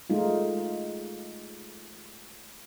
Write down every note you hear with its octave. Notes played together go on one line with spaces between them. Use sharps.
G#3 A3 D#4 F4